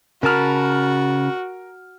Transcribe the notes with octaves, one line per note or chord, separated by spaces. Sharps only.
C#3 F#4 A#4 A5 B5 F6